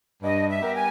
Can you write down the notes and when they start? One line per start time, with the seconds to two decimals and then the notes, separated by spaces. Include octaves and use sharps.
0.23 G2 D#5
0.48 E5
0.61 G3 B3 G4 A#4
0.74 G#5